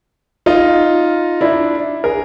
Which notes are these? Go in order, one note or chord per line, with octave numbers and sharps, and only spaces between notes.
D#4 F4
D4 E4
G#4 A#4